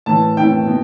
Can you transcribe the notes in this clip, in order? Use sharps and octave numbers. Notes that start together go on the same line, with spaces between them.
A2 E3 A5
A2 E3 G5
B2